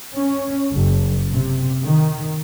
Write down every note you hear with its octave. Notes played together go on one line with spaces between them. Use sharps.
C#4
F#1
C3
D#3